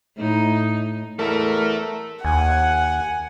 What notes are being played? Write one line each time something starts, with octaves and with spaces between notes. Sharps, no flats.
A2 D#4
E2 A3 A4 A#4 E5
D#2 F#5 G#5